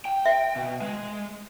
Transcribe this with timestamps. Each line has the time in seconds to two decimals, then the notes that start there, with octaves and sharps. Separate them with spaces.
0.05 G5
0.26 E5
0.56 B2
0.82 G#3